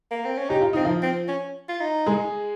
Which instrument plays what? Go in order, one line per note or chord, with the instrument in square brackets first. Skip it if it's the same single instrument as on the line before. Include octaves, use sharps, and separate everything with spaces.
[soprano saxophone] A#3
C4
C#4
[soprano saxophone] D#4 [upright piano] G4
[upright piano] F4
[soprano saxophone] C4 [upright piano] D#4
[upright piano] F3 F4
[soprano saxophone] C4
C#4
F4
D#4
[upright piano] G#3 G#4